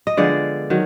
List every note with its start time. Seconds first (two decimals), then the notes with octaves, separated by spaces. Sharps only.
0.07 D#5
0.17 D3 F3 G#3 B3 D5
0.70 D#3 F#3